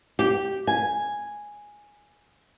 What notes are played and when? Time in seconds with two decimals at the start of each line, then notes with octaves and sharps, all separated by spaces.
0.19 G4
0.67 G#5